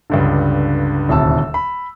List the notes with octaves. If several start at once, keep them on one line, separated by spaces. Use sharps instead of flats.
C#2 G2 D3
D#1 D2 C3 A5 E6
B5